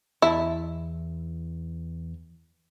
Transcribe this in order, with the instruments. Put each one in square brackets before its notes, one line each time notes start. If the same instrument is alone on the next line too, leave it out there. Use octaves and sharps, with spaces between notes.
[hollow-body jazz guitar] E2 D#5 A5 [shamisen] E4